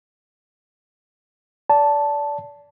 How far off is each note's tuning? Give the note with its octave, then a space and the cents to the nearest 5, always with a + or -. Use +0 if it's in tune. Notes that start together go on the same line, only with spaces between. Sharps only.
D5 -25 A5 +0